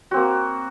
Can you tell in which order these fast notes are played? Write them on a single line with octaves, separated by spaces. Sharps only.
F#4 C4 A#3